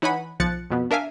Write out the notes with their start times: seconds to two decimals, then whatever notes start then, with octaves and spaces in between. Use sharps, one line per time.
0.02 E3 D#4 C#5 F#5 G#5 B5
0.40 B1 F3 F#6 A6 C#7
0.70 F2 B2 B3
0.91 D4 A#4 E5 F5 G#5